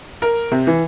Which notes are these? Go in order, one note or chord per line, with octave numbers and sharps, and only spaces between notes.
A#4
C3
E3